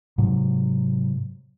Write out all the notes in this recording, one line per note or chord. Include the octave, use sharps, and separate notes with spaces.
G#2 C3 F#3